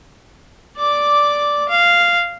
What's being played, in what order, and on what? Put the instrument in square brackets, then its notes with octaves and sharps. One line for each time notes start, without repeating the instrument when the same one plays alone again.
[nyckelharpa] D5 D6
F5